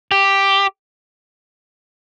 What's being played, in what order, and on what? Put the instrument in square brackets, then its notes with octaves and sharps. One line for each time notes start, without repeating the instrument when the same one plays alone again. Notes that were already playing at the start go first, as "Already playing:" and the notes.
[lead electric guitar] G4